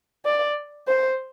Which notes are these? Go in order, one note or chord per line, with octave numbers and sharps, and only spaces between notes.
D5
C5